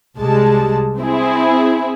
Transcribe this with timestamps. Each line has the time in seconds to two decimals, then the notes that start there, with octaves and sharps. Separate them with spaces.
0.18 C2 G3 G#3 A5
0.99 C4 E4 G#4